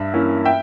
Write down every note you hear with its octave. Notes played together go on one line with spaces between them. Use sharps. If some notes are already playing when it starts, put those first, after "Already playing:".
Already playing: G2 E5
E3 A#3 C#4 E4
E5 G5